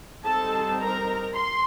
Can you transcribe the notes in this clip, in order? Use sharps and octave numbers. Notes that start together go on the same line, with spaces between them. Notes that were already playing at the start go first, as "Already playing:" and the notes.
G3 C4 D#4 A4 A5
A#4 A#5
C6